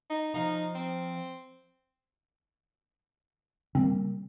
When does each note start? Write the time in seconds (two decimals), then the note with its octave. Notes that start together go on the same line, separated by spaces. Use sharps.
0.10 D#4
0.34 F3 D#4 F5 A#5
0.75 C4
3.75 C#3 G3 A#3 C4